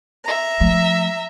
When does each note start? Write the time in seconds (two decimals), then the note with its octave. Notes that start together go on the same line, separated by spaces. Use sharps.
0.23 E5 A#5
0.60 F3 A3